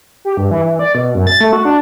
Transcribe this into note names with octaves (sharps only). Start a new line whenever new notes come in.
G4
G2
E3
E3
D5
B2
F#2
A6
A3
F#4
D4